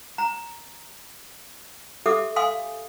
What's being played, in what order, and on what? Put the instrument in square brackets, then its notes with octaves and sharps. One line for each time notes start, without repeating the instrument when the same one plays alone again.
[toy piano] A#5
G4 A4 E5 D6 D#6
F5 G#5 C6 D#6